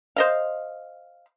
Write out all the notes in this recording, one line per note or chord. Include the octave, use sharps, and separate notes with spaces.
C5 D#5 F5